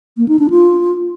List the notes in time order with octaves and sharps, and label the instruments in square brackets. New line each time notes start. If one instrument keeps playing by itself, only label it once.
[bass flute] A#3
D#4
D4
F4